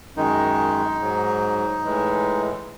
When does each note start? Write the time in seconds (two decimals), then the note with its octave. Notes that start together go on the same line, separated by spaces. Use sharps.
0.16 F#2 D#3 G#3 D#4
0.99 G#2 F#3
1.83 A2 E3 G#3